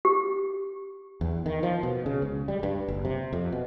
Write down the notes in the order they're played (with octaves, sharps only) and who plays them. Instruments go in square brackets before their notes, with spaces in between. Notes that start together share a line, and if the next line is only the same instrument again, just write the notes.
[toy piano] G4
[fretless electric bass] E2
D#3
F3
B2
C#3
C#2
G3
G2
F#1
C3
F2
B2